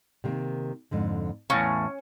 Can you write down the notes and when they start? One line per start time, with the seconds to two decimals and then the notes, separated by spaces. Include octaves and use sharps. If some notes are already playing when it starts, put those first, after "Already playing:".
0.24 C3 D#3 A#3
0.91 F2 G#2 D3
1.50 E2 A2 C3 C#4 F5